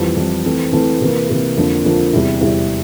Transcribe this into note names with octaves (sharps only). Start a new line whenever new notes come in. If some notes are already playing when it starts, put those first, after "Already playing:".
Already playing: F2 E3 G3
F2 E3 G3
E3 A3 C4
E3 A3 C4
C3 E3 A#3
C3 E3 A#3
F2 D3 F3 A#3
F2 D3 F3 A#3
E2 C3 G3 C4 E4
E2 C3 G3 C4 E4